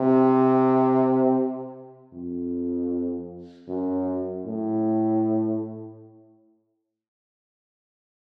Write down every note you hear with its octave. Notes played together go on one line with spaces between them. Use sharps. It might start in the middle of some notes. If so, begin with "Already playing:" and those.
Already playing: C3
F2
F#2
A2